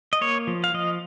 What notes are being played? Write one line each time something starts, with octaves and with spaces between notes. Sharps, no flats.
D#5
A#3 C#5
F3
F5
F3 D#5